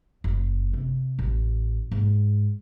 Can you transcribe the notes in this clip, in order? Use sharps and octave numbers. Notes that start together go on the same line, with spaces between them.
F#1
C3
A1
G#2